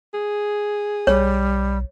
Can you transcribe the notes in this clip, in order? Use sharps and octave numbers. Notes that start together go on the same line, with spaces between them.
G#4
B1 G3 C#5